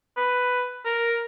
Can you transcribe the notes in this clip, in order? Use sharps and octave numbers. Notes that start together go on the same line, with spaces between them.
B4
A#4